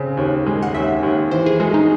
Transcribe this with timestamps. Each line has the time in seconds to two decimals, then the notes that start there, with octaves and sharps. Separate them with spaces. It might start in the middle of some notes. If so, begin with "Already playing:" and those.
Already playing: C#3 C4
0.17 D#2
0.46 G#3
0.63 F#5
0.75 D#2 E5
1.03 D#2
1.31 E3 C5
1.46 G#4
1.60 G#3 F#4
1.74 D#4